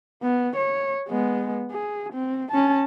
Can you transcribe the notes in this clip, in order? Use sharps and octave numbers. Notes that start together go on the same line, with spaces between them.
B3
C#5
G#3 B3
G#4
C4
C#4 A5